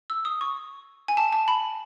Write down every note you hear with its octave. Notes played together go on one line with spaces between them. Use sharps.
E6
D#6
C#6
G#5
A5
A5
B5